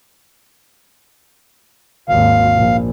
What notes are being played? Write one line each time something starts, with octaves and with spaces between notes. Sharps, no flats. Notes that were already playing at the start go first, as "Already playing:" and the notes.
G#1 D#2 F5
A#1